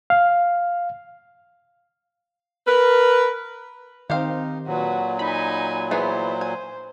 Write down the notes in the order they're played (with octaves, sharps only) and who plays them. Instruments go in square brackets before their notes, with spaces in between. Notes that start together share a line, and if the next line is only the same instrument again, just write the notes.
[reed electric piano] F5
[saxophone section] A#4 B4
[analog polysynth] D#3 C4 [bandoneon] D#4 [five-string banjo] G4 C5 F5
[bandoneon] A#2 F#3 [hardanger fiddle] F#4 B4
[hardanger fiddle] D#4 G#5 [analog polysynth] B5
[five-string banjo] E3 B3 G#4 [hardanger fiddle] C5
[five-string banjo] G#5